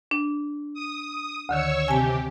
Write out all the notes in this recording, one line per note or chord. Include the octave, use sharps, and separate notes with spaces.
D4
D#6
D2 D3 D#3 C#5 C#6 E6
C3 G4 G#5 A5